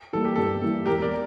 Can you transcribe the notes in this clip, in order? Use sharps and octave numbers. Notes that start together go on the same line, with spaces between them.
E3 G3 A#3 A4
G4
G2 A4
E3 G3 A#3
E1 G4 A#4
A#4 D5